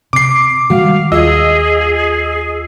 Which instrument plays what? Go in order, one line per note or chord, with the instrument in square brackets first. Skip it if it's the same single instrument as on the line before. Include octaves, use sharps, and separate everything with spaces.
[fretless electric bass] C3 [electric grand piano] D6 C7
[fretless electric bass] D#3 G3 G#3 [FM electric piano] F#4 [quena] F5
[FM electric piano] D#2 F4 E6 [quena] G#4 [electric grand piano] D#5